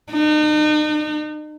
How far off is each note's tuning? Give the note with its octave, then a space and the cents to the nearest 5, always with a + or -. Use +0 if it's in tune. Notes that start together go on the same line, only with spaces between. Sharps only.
D#4 -40